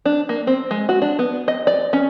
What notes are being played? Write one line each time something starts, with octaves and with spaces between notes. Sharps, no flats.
D4
A#3
C4
G#3
F#4
D4
B3
D#5
D5
C#4